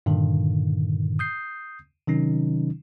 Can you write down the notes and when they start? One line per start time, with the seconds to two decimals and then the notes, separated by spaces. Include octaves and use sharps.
0.06 G2 A#2 D3 D#3
1.19 D#6 G6 C7
2.07 C3 D#3 F#3 C#4 D#4